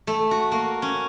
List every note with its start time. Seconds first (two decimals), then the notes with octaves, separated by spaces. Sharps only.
0.07 A3
0.31 F#4
0.52 A#3
0.82 C#4